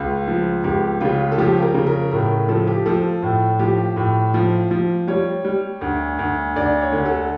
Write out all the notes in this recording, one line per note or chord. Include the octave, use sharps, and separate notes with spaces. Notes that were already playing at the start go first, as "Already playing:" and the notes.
Already playing: C#2 F4
F3
C#2 G4
C#3 F4
A4
F3 G4
A#4
C#3
A#4
A2 A#4
F3 A4
G4
F3 A4
A2
F3 G4
A2
F3
F3
G3 C#5
G3
D2
D2
D2 D5
C#5
D3
A4